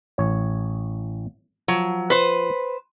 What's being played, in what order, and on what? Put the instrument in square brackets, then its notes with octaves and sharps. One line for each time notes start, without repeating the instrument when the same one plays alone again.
[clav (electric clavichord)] A1 C#5
[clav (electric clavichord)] F3 [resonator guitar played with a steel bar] F#3
[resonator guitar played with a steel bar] B4 C5